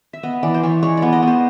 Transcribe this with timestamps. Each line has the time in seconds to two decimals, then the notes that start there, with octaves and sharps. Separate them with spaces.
0.13 E5
0.23 B3 D#5
0.43 E3 D5
0.54 C5
0.63 E3 C#5
0.83 G#3 C#5
0.97 B3 D5
1.13 D#5
1.23 B3 C5